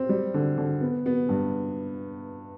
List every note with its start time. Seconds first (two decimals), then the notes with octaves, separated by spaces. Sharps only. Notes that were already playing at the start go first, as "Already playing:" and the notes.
Already playing: C4
0.09 G3
0.34 D3
0.58 D3
0.81 B3
1.06 B3
1.29 G2